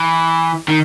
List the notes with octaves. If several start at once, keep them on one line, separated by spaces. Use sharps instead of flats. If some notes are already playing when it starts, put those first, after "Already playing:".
Already playing: E3
D#3